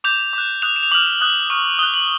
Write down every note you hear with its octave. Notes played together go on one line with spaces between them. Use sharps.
D6 G6 F7
D6 F#6
D#6 F#6 F7
E7
F7
D6 F6 F#7
D#6 F#6
C#6 F6
D#6 F#6 G7
F#7